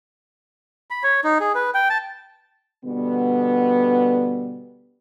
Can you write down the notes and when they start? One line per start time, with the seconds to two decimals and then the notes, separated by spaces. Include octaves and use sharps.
0.90 B5
1.03 C#5
1.24 D#4
1.40 G#4
1.55 B4
1.74 G5
1.90 A5
2.85 B2 D3 G3 B3